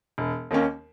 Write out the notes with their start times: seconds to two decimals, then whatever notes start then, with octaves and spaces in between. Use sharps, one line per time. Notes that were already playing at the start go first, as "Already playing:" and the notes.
0.18 E1
0.51 D#2 D#3 A#3 C#4